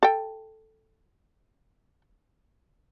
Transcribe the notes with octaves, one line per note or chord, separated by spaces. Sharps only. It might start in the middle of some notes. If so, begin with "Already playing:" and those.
A4 G5